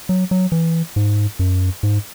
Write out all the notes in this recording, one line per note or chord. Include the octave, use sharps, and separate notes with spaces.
F#3
F#3
E3
G#2
F#2
G#2